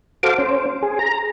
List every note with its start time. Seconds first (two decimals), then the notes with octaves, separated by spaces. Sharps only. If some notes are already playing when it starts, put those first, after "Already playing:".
0.23 F#4 A4 C5 F5 D6
0.38 C#4 C5
0.82 G#4
0.99 A#5